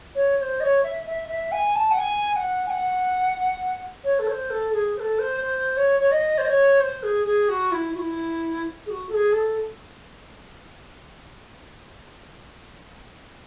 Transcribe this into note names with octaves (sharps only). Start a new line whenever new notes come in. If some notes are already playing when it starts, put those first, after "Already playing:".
C#5
C#5
C5
D#5
C#5
E5
E5
E5
G#5
A5
F#5
G#5
G#5
F#5
G#5
F#5
C#5
A4
C#5
C5
A4
G#4
C5
A4
C5
C5
C#5
C#5
D#5
C5
D#5
C#5
C5
G#4
G#4
F#4
E4
F#4
E4
G#4
F#4
A4
G#4
A4